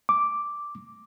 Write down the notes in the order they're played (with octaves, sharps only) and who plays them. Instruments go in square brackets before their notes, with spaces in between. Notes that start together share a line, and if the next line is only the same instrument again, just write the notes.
[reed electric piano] D6